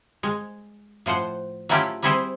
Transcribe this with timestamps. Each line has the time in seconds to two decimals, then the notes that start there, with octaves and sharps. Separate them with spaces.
0.23 G#3
1.06 A2 F3 C5 F#5
1.69 F#3 A3 C#4 E4 F4 G4
2.03 G3 C4 E4 G4 G#4 C5